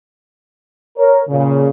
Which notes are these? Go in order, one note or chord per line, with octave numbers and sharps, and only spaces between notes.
A#4 C#5
A#2 C#3